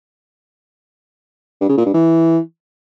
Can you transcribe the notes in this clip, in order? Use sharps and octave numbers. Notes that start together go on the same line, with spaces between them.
G2
C#3
A#2
G2
E3